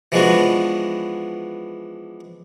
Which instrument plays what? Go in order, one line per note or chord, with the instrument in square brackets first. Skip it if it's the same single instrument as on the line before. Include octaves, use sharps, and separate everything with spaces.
[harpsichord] E3 F3 G#3 B3 D4 F#4